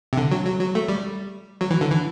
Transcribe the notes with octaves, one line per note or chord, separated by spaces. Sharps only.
C3
D3
F#3
F#3
F#3
A3
G3
F#3
E3
D3
E3